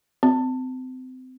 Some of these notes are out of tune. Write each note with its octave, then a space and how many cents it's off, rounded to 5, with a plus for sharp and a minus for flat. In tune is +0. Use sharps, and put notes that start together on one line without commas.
C4 -30